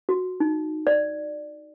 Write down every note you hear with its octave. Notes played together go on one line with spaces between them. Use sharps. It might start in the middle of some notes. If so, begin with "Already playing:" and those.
F#4
D#4
D5